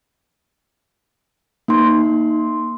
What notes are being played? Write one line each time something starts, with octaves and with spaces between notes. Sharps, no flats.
A#3 D#4 C6